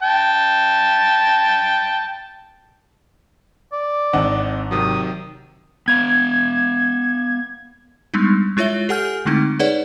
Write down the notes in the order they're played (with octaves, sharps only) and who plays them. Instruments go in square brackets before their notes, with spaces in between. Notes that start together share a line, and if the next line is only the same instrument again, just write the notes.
[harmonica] G5 A5
[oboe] D5
[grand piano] G#1 F#5 [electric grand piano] C4 D4 D#5
[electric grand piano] C3 D#3 F#3 [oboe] D#6
[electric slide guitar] B3 F5 [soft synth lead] G#6
[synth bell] G3 G#3 B3 D4 D#4
G#3 E4 F4 C#5 E5 G7
G4 A4 F#5 G#5 F6 G6
D3 G#3 A3 C4 D#4 E4
D#4 G#4 B4 C#5 D5 F#5